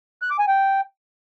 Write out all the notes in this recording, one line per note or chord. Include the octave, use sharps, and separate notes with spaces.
F#6
D6
G#5
G5